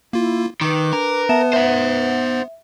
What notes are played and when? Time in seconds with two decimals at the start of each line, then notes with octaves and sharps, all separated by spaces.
0.13 A#3 E4 F4
0.61 D#3 B4 D6
0.93 D4 A#4
1.29 B3 E5 A5 E7
1.53 C5 E5 F#5